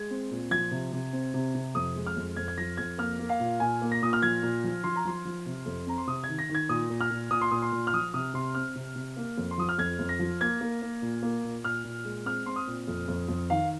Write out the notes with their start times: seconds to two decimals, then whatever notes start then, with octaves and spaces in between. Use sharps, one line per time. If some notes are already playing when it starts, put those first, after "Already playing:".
Already playing: G#3 G#6
0.11 C4
0.31 A#2
0.51 F3 G#6
0.71 C3
0.93 C3
1.13 C4
1.34 C3
1.55 C3
1.75 F2 D#6
1.96 G#3
2.06 F6
2.16 F2
2.36 F2 G#6
2.48 G#6
2.58 F3 A#6
2.77 F2 G#6
2.98 A#3 F6
3.19 A#3
3.29 F5
3.40 A#2
3.60 A#2 G#5
3.82 A#3
3.92 A#6
4.02 A#2 D#6
4.13 F6
4.22 F3 G#6
4.43 A#2
4.64 F3
4.84 F3 C6
4.96 A#5
5.05 F3 C6
5.25 F3
5.46 C3
5.66 F2
5.87 C4 A#5
5.98 C6
6.07 C3 D#6
6.24 D#3 G#6
6.39 A#6
6.49 D#3
6.55 G#6
6.69 A#2 D#6
6.90 A#2
7.01 F6
7.11 A#2
7.31 A#2 D#6
7.41 C6
7.51 A#2 D#6
7.62 C6
7.72 A#2
7.87 F6
7.93 F3 D#6
8.14 C3 D#6
8.34 C3 C6
8.55 C4 F6
8.75 C3
8.96 C3
9.17 A#3
9.38 F2
9.51 C6
9.58 F3 D#6
9.69 F6
9.78 F2 G#6
9.99 F2
10.09 A#6
10.19 F3
10.41 A#3 G#6
10.61 A#3
10.82 A#3
11.02 A#2
11.22 A#3
11.44 A#2
11.64 A#2 F6
11.84 A#2
12.05 G#3
12.25 C4 F6
12.46 C4 C6
12.56 D#6
12.67 A#2
12.88 F2
13.08 F2
13.29 F2
13.50 D#3 F5